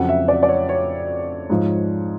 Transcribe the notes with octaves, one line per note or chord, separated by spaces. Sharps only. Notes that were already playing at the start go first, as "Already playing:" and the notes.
Already playing: F2 C#3 F#3 F#5
E5
D5
D5
C#5
C#5
G#2 F3